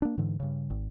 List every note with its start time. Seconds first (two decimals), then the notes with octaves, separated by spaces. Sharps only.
0.02 A#3 D4
0.18 G#2 D3 E3
0.40 G2 C#3
0.70 G#1